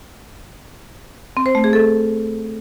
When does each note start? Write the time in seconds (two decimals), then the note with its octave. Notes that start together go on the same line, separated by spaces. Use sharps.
1.37 C4
1.46 C5
1.55 A3
1.64 G#4
1.73 A4